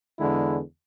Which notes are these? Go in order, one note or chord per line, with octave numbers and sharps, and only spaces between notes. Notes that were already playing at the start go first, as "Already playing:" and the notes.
E2 D3 G#3 E4